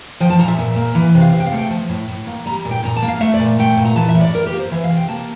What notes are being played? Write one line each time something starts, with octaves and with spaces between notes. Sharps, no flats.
F3 G5
A5
A#2 A#5
E5
A#2
A#3
E3
C3
F5
C3 E5
G5
F5
A3
G5
F3 A5
A2
A2
A#3
G3 A#5
A#2
G5
A#2 A#5
A5
A#3
F5
A3 E5
D5
A#2
A3 G5
A#2
A#5
E3 A5
E5
A2
D5
A2 A#4
G4
A#3
C5
E3 E5
F5
C3
G5
A#3 A5